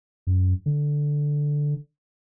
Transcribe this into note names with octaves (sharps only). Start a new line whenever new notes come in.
F#2
D3